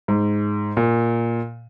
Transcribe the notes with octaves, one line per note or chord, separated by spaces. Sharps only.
G#2
A#2